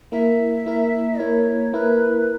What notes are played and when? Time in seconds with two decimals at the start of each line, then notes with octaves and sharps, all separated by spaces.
0.12 A#3 E4 A#4 E5
0.66 A#3 E4 A#4
1.19 A#3 E4 A#4 C#5
1.73 A#3 E4 A#4 B4